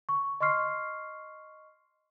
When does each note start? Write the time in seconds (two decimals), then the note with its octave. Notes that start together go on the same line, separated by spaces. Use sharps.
0.09 C#6
0.40 D#5 C6 C#6 F6 C7